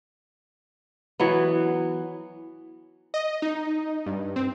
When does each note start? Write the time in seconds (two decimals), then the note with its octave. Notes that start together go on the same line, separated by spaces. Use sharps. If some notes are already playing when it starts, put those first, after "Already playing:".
1.20 E3 F#3 B3
3.14 D#5
3.42 D#4
4.06 G2
4.36 C4